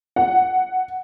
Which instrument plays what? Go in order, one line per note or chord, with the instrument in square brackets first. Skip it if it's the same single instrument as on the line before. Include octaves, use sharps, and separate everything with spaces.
[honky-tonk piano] F#5